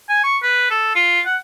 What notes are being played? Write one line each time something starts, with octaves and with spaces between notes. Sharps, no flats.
G#5
C#6
B4
A4
F4
F#5